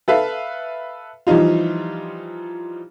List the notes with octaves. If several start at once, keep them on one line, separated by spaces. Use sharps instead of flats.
A4 B4 E5 F5
E3 F3 G3 D#4 F4